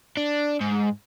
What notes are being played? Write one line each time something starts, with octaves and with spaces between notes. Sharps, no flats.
D4
G#2